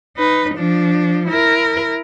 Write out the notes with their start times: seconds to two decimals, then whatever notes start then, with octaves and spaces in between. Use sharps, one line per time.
0.17 D#4 B4
0.55 F3 D4
1.28 E4 A#4